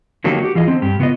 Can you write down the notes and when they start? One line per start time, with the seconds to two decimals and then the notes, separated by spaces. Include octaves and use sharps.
0.24 D3 D#3 F#3 A#3 D#4 G4
0.39 F#4 G4
0.55 E3 F4 G#4 D#5
0.67 D3 C4
0.82 G2 G4
0.99 C#3 B3 F4 G4 B4 D#5